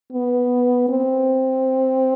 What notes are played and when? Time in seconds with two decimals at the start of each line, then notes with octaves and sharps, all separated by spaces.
0.13 B3
0.89 C4